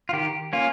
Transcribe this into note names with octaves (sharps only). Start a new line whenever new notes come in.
F4
D#3 G4
A#3 C#4 F4